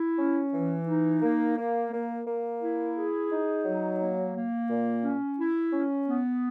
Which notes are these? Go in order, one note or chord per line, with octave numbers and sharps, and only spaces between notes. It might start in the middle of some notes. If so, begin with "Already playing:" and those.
Already playing: E4
C#4
E3
D#4
A#3
A#3
A#3
A#3
E4
G#4
D#4
F#3
A#3
A#3
A#2
C#4
E4
C#4
B3